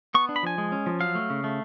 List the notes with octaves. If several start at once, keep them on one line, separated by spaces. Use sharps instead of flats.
B3 C#6
D4
B5
F3 G#5
G#3
C#4
F3
F#3 F5
A3
C#3
A3